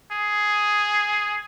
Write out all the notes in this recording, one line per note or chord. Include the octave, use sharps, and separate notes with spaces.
G#4